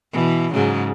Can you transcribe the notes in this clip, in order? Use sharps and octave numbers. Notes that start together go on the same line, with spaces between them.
B2 E3
G#2 C#3 F#3